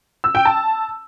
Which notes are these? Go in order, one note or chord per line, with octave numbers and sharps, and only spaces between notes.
E6
G5
A5